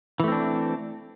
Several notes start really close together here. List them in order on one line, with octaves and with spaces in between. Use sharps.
E3 A3 C4 D4